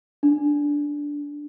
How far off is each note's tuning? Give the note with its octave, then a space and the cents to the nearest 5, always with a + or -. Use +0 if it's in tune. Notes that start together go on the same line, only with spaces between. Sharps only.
D4 -10